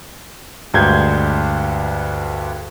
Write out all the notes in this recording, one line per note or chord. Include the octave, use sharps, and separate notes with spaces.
D2 G2 G#3 A#5 G6 G#6